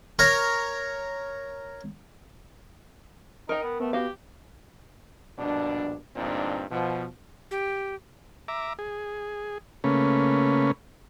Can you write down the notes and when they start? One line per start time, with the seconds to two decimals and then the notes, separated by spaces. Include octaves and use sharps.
0.19 A#4 C#5
3.49 D#4 A#4 G5
3.63 B3
3.80 A3 B3
3.93 F#4 G4 F5
5.39 A#1 G2 B2 D4
6.16 D2 G2 A#2 C4 D4 D#4
6.71 B2 F3
7.51 G4
8.48 E5 A#5 D6
8.79 G#4
9.84 C#3 A3 A#3 C#4 B4